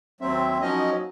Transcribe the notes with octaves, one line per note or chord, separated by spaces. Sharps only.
D#2 F#3 C4 E5
F3 F#3 A#3 C#4 D#4 D#5